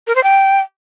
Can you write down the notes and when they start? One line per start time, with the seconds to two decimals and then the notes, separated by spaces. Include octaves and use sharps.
0.07 A#4
0.15 C5
0.24 G5